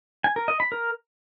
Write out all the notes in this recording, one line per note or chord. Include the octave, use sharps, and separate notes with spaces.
G#5
A#4
D#5
B5
A#4